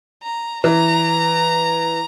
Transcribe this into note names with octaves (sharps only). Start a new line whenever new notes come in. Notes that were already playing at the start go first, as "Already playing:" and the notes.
A#5
E3 A#5